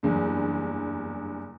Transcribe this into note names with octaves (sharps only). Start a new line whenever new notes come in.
F#1 E2 G2